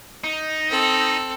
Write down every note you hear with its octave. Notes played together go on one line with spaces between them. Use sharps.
D#4
C4 A4